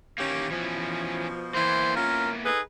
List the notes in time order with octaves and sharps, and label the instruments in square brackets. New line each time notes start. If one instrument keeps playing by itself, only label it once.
[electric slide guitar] D#3 E3 A#3 [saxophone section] C#4 G4
[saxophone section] B2 F3 [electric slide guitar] E3 C#4
[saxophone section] E3 [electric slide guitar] A#3 B3 E4 [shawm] C5
[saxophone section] C#4 F4 [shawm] A#4
[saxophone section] D#4 A4 B4 [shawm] G#4